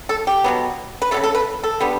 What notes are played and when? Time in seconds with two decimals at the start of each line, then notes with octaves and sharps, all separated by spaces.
0.09 A4
0.27 G4
0.44 B2 F#3 B3
1.02 B4
1.11 F#3 A3 A4
1.17 C#3
1.24 A4
1.35 B4
1.64 A4
1.80 D3 G3 B3